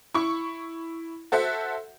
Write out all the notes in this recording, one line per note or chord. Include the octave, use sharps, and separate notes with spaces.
E4 C#6
F#4 A4 C5 E5 F#5